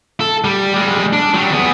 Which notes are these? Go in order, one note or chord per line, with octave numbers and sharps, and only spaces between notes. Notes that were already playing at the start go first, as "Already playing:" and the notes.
A4
G3
G3 G#3
D4
F#3 G3
B3 G#4